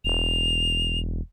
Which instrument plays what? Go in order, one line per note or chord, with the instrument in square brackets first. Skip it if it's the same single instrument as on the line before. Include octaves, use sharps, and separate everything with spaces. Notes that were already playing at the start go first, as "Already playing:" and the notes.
[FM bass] E1 [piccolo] F7